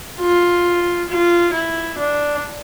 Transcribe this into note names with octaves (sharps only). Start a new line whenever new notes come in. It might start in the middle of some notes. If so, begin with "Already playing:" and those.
F4
F4
E4
D4